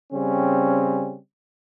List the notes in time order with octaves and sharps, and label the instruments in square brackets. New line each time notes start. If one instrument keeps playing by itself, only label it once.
[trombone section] C#3 G3 C4 C#4